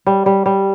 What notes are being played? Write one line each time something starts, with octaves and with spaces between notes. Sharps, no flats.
G3
G3
G3